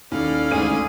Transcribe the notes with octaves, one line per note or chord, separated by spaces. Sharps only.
D#2 C#4 E4 A4 D5 F5
G#1 D2 G#4 D#7